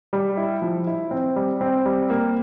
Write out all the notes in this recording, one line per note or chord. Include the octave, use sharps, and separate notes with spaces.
G3
E4
F3
E4
C4
G3
C4
G3
A#3